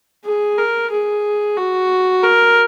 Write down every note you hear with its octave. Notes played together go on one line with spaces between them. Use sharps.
G#4
A#4
G#4
F#4
A#4